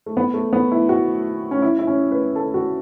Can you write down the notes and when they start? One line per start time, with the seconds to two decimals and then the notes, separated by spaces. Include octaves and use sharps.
0.06 A3
0.17 B3
0.34 A3
0.53 B3
0.72 E4
0.89 F#4
1.51 C#4
1.62 E4
1.79 E4
1.87 C#4
2.12 B4
2.36 A4
2.54 F#4